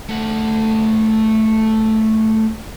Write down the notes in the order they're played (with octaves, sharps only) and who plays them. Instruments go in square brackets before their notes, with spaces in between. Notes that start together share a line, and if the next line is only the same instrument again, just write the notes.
[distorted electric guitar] A3 F#5